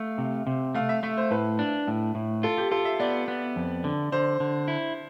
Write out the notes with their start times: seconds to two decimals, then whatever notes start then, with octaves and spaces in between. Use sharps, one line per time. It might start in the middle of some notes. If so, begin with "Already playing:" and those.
Already playing: A3 F5
0.18 C3
0.47 C3
0.75 A3 F5
0.89 E5
1.03 A3 E5
1.17 C5
1.31 A2 B4
1.59 D4
1.87 A2
2.15 A2
2.43 F4 A4
2.58 G4
2.71 F4 A4
2.85 E5
3.00 B3 D5
3.28 B3
3.56 F2
3.84 D3
4.12 D3 C5
4.40 D3
4.68 E4